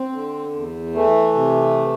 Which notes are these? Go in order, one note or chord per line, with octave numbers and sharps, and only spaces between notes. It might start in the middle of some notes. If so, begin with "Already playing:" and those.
Already playing: C4
D3
E2
E3 A3
C3